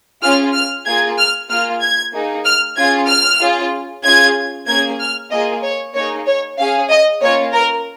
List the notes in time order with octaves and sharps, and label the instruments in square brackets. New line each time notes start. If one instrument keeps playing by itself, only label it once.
[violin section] C#4 F4 G#4 F6
F6
A#3 F4 G#4 G#6
F6
A#3 F4 G#4 F6
G#6
A#3 D#4 G#4
F6
C#4 F4 G#4 G#6
F6
C#4 F4 G#4
C#4 F4 G#4 G#6
A#3 C#4 G#4 G#6
F6
A#3 F4 G#4 D#5
C#5
A#3 D#4 G#4 C#5
C#5
C#4 G#4 F5
D#5
A#3 C#4 F4 C#5
A#4